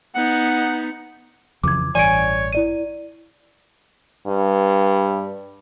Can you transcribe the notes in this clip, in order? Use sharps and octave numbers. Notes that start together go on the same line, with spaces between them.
B3 D#4 F#5
F2 C#3 E3 D6 G#6
A1 G2 E3 C#5 D5 G#5 D7
E4 D5 D#7
G2